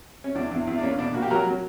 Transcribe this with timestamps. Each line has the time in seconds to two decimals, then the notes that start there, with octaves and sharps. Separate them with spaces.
0.24 C#4
0.35 E2 D4
0.51 E2
0.67 E2
0.78 D4
0.83 A#3 C#4
0.99 B2 D4
1.14 A#3 F#4
1.22 G4
1.30 F#3 F#4 A#4
1.47 F#3